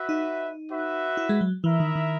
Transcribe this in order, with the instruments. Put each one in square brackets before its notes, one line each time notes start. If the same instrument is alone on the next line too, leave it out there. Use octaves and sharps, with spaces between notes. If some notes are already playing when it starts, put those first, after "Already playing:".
Already playing: [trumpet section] F#4 B4 E5
[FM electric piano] D#4
[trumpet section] F#4 B4 E5
[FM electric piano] E4
G#3
F#3
[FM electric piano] E3 [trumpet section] E4 A#4 E5
[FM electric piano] D#3
D#3